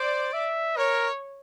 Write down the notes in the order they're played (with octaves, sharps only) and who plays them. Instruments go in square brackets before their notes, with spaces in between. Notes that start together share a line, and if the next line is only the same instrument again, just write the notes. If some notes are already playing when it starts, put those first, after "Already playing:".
Already playing: [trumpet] C5 [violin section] D5
[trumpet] E5
[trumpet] A#4 [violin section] C#5